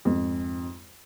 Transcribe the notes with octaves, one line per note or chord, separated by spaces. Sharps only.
F2 G#2